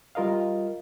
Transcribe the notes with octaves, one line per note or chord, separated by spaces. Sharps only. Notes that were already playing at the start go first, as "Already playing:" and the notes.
G3 F4 A#4 D#5 F5